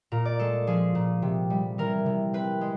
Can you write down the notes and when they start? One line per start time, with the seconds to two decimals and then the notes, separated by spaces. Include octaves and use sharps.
0.12 A#2 A#4
0.25 D5
0.39 G#3 A4
0.67 F3 G#4
0.95 A#2
1.22 C3
1.50 G3
1.78 E3 A#4
2.06 C3
2.33 C4 B4
2.61 G#3